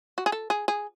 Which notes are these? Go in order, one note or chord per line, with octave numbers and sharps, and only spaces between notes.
F#4
G#4
A4
G#4
G#4